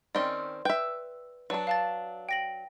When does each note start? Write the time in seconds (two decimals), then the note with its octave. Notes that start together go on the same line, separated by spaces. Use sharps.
0.15 D#3 C4 C#4 D5 C6
0.65 B4 E5 G5
1.50 F#3 D4 B4 D5 A5
1.67 F5 A5 A6
2.29 G5 A#6 F#7